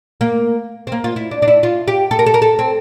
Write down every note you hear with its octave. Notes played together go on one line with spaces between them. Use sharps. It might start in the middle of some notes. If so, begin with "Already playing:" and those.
A#3
C4
A#3
F4
E4
D4
D4
E4
F4
G4
A4
A#4
A4
A#4
A4
C4